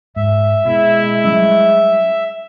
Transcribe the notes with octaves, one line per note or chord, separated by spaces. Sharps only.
G#2 E5
B2 G#3 E4
F#3 G3 C#4 E5